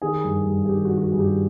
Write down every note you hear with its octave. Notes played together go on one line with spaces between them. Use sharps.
D#3 G#4
G2
G2
G#4
D#3 G4
F#4
D#3
F#4
G4
G2 G#4
G4